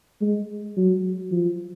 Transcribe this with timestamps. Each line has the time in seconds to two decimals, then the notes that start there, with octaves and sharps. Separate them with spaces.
0.21 G#3
0.77 F#3
1.32 F3